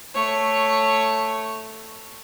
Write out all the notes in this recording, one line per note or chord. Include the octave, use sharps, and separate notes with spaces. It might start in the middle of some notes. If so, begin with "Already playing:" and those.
A3 C#5